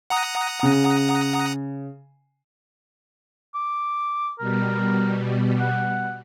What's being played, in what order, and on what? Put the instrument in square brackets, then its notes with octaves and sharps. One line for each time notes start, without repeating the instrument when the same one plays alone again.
[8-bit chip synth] F#5 A#5 D#6
[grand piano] C#3
[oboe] D6
[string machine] B2 G3 [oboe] A#4
[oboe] F#5